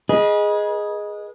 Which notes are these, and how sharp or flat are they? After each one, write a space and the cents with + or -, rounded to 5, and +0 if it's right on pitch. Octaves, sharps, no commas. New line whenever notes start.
G#4 +0 B4 -35 D#5 +0